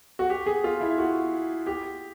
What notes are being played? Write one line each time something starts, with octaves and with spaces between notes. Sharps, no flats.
F#4
G4
G#4
F4
E4
F#4
G4